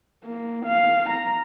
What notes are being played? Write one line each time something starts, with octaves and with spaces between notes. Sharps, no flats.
A#3
F5
A#5